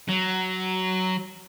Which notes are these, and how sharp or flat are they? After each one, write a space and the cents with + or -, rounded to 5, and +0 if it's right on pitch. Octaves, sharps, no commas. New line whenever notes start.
F#3 +10